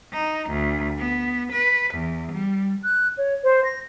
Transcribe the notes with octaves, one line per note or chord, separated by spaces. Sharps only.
D#4
D2
B3
B4
E2
G3
F#6
C#5
C5
A#6